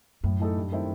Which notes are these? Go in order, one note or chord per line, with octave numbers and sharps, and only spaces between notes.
F#2 A2
E3 A3 D#4 A4
G2
D#3 A3 C4 E4